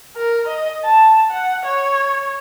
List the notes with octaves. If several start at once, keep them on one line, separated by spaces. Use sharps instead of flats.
A#4
D#5
A5
F#5
C#5